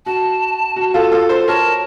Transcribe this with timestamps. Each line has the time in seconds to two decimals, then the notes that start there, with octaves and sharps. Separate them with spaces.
0.06 F#4 A5
0.76 F#4
0.94 F4 A4
1.12 F4 A4
1.29 A4 C5
1.48 A#4 C#5 A5